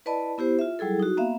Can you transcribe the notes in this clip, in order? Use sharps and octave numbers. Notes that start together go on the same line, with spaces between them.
E4 B4 D5 D#5 A5 B5
B3 E4 G4 C5
F4 E5
F#3 G3 E4 G#4 A4
D#4 F#4
A#3 B3 E5 F5